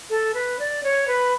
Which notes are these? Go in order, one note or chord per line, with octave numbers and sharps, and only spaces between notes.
A4
B4
D5
C#5
B4